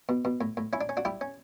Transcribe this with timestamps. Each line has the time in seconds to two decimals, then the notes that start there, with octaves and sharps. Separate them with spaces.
0.09 B2
0.25 B2
0.41 A2
0.57 A2
0.73 C#4 E4
0.81 D4
0.89 C#4
0.97 D4 F#4
1.05 G3 E4 G4
1.21 C#4